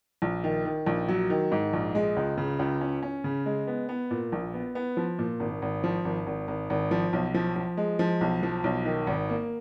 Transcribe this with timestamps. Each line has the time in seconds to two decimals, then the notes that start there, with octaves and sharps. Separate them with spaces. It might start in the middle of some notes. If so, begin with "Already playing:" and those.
0.22 A#1
0.44 D#3
0.65 D#3
0.86 A#1
1.09 F#3
1.30 D#3
1.52 G#2
1.73 A#1
1.95 G#3
2.17 C#2
2.38 C#3
2.59 C#2
2.81 C#4
3.03 C#4
3.24 C#3
3.46 G#3
3.67 B3
3.89 B3
4.11 A#2
4.32 A#1
4.54 B3
4.75 B3
4.97 F3
5.19 A#2
5.40 G#1
5.62 G#1
5.84 F3
6.05 G#1
6.26 G#1
6.48 G#1
6.70 G#1
6.91 F3
7.13 B1
7.34 F3
7.56 F3
7.77 G#3
7.99 F3
8.21 B1
8.43 F3
8.64 B1
8.85 D#3
9.07 G#1
9.29 A#3